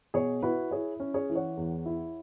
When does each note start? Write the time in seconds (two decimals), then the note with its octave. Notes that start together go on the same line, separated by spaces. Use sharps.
0.14 B2 G#4 C#5
0.42 E4 F#4 B4
0.71 E4 G#4 C#5
1.00 C#4
1.14 G#4 C#5
1.30 E3
1.35 C#5 F#5
1.57 E2
1.86 E4